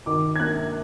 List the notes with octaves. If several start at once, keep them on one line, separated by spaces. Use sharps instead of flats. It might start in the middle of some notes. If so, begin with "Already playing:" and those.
D#3 D6
G#6
A#3 F#6